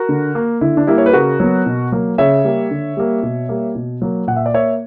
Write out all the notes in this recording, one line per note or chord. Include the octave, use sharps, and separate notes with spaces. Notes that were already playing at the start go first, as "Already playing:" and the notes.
Already playing: F#4 A#4
D3
A#3
D3 E4
D4
G3 A#3 E4
C#5
B4
C#3 F#4 A#4
F#3 B3
B2
F#3 A#3
C#3 C#5 E5
G3 A#3
D3
G3 A#3
B2
G3 A#3
B2
F#3 A#3
A#2 F#5
E5
D5
A#3 C#5 E5